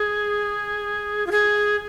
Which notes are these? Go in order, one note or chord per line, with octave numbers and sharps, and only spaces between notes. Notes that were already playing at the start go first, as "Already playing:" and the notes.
Already playing: G#4
F4
G#4